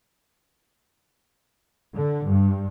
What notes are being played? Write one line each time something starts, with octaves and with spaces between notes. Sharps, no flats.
D3
G2